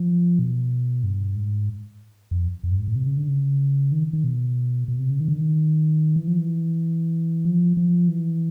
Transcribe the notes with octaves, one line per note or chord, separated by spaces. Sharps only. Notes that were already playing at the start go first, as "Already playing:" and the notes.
Already playing: F3
B2
G2
G#2
F2
F2
G2
G#2
A2
C3
C#3
D3
C#3
D#3
D#3
B2
B2
C3
C#3
D#3
D3
D#3
E3
F3
E3
F3
F3
E3